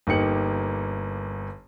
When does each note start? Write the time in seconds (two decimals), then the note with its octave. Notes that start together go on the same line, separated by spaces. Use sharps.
0.07 G1 A#3 D#4 G4 C#7 F#7